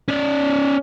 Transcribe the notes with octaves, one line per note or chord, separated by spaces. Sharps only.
C#4 D5